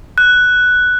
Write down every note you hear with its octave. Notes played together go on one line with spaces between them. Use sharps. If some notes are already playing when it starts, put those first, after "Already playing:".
F#6